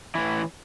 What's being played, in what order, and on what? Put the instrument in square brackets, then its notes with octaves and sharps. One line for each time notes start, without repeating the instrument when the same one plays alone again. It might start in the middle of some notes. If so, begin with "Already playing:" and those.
[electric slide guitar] A2 E3 E4